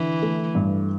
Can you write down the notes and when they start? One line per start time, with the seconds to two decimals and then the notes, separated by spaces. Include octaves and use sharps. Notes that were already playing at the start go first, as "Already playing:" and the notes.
Already playing: D3 E3
0.22 A3
0.55 G2